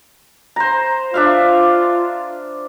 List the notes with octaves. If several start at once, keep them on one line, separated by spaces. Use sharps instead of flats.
C5 A#5
D4 F4 E5 F5